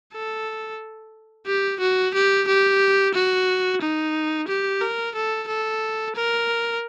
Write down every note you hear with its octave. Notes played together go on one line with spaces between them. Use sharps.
A4
G4
F#4
G4
G4
F#4
D#4
G4
A#4
A4
A4
A#4